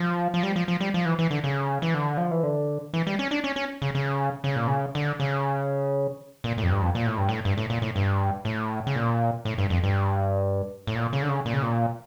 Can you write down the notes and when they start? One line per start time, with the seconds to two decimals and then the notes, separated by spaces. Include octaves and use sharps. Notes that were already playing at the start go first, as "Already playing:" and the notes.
Already playing: F3
0.34 F3
0.43 G3
0.56 F3
0.68 F3
0.80 G3
0.94 F3
1.06 E3
1.19 E3
1.31 D3
1.44 C#3
1.82 E3
1.94 D3
2.17 F3
2.31 E3
2.43 D3
2.94 E3
3.07 G3
3.19 C#4
3.31 D4
3.44 C#4
3.56 C#4
3.82 C#3
3.95 C#3
4.44 C#3
4.56 A#2
4.67 C#3
4.95 D3
5.20 C#3
6.44 A#2
6.58 A2
6.63 F2
6.70 G2
6.82 F2
6.95 A#2
7.06 A2
7.18 G2
7.29 A2
7.45 G2
7.58 A2
7.70 A#2
7.82 A2
7.96 G2
8.45 A2
8.87 C#3
8.96 A#2
9.45 A2
9.58 G2
9.70 F2
9.83 G2
10.87 A2
10.95 A#2
11.13 C#3
11.22 D3
11.29 C#3
11.46 A#2
11.54 C#3
11.63 A#2